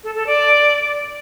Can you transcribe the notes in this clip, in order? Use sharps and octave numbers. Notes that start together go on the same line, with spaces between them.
A4
A4
D5